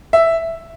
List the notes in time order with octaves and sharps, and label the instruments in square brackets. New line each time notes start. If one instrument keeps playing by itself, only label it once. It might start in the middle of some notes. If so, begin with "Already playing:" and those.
[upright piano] E5